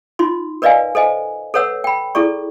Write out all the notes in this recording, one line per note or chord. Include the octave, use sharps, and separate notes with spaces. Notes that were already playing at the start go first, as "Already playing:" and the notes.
D#4 F4 C6
A#4 B4 D5 D#5 F5 G#5
A4 C5 D#5 G#5
A4 B4 C#5 F#5 E6
G5 B5
E4 G#4 A4 D5 C#6